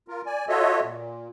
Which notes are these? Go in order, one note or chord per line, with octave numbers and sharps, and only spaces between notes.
F4 A#4
D5 G#5
F4 F#4 A4 C#5 D#5 E5
A#2